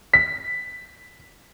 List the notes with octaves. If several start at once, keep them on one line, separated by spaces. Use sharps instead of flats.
B6